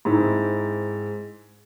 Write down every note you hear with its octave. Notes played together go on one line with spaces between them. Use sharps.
G#2 C4 E4